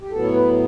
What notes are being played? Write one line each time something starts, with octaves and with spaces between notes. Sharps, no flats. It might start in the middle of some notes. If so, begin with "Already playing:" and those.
G4
A2 F#3 B3 A4
C#5
B4